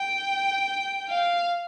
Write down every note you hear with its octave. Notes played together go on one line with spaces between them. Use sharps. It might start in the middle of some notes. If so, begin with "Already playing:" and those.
Already playing: G5
F5